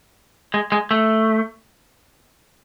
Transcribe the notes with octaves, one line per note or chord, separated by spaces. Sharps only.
G#3
G#3
A3